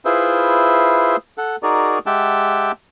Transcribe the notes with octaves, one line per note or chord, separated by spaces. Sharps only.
E4 F4 G#4 B4 C5 E5
A4 F#5
D#4 F#4 G#4 A#4 D5
G#3 G4 E5 F#5 G5 A5